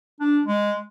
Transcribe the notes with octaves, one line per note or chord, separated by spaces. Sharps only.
D4
G#3